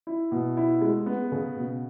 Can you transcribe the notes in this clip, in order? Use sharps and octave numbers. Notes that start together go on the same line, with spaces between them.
E4
B2
E4
G#3
B3
C#3
B2